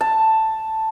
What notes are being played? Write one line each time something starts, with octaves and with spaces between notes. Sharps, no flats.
A5